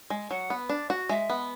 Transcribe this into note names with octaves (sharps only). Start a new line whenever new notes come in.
G#3
F#3 F#5
B3
D4
F#4
G#3 E5
B3